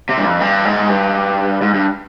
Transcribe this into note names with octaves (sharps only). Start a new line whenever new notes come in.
C3
G2
F2
G2
G#2
G2
G#2
G2